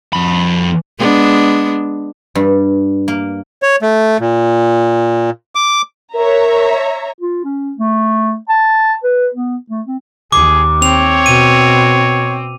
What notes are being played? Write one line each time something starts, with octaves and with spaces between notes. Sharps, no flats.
F2 B5
G#3 B3 D4
G2
A#3
C#5
A3
A#2
D6
A#4 C#5 E5 A#5
F4
C#4
A3
A5
B4
B3
A3
C4
D#2 G#4 D6
C4 C#5 F7
B2 D#7